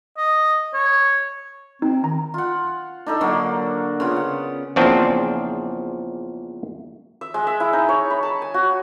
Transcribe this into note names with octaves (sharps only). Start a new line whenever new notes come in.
D#5
C#5
C4 D#4
D#3 A#5
F4 F#5
D4 D#4 A4
D3 F#3 A#3 F#5
C#3 B3 F4
F#5
E2 A#2 C#3 F3 C4 D4
E5
G#3
E5
E4
D#4
C#5
B5
A5
G#5
F#4